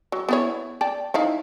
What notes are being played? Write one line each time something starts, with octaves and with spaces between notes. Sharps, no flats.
F#3
B3 E4 C#5
D5 G5 A5
D#4 E4 F5